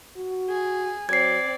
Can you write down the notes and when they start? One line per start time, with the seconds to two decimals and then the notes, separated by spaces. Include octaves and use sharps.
0.17 F#4
0.49 G#4
1.09 F#3 C4 D5 G#6 C7